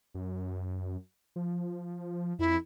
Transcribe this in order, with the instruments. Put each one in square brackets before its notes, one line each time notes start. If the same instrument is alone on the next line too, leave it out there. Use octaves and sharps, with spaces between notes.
[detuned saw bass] F#2
F3
[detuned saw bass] F2 [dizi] E4